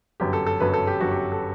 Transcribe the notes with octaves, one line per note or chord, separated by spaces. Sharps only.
G1 F#2 F#3 G4
A4
A4
G1 F#2 F#3 B4
A4
G4
G1 F#2 F#3 F#4
G4
A4